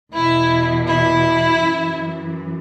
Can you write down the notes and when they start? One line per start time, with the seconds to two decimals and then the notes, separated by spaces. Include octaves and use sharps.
0.13 E2 B2 E4
0.88 E4
1.61 F#2 E3